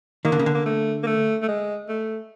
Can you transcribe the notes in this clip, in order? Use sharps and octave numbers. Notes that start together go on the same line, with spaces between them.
D#3 A#3
D3
C#3
D3
A#3
A3
A#3
A3
A3
G#3
A3